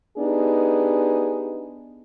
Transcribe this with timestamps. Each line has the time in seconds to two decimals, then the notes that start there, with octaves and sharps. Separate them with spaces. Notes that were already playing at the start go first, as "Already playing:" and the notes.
0.18 B3 D4 D#4 G4 G#4